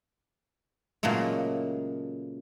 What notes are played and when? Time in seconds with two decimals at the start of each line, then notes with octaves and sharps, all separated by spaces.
1.03 A#2 C#3 F#3 G#3 A3